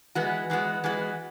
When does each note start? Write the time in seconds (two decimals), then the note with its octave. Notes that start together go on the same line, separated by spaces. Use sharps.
0.15 E3 G#3 B3 F#4
0.50 E3 G#3 B3 F#4
0.84 E3 G#3 B3 F#4